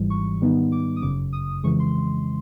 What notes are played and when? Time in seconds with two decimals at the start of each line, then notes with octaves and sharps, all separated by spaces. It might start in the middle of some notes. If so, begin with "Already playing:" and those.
Already playing: G#1 G#2 E3 G3
0.10 C#6
0.41 G#2 D#3 G3 B3 D#4
0.72 D6
0.96 D#6
1.02 G1 F#2 C#3 D6
1.33 D#6
1.63 F2 C#3 E3 G#3 C#6
1.80 C6